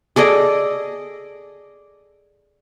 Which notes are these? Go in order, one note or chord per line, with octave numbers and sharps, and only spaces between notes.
G#4 A4 D5 D#5